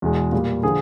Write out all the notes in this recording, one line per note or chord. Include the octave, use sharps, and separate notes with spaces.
E2 B2 G#3
A#2 G3 A#3
D3 F3 G#4